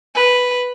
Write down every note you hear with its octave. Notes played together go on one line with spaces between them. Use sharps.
B4